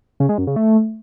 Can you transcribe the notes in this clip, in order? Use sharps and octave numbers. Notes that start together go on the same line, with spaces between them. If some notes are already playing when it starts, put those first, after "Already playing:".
C#3
G#3
F#2
C#3
A3